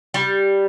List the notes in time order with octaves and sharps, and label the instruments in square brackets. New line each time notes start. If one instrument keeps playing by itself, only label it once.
[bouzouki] G3